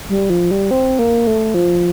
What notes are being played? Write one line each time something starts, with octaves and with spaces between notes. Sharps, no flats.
G3
F3
G3
C4
A#3
A3
F3